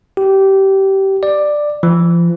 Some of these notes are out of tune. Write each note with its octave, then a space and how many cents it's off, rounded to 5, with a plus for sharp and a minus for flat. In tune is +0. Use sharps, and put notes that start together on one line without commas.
G4 -20
D5 +10
F3 -35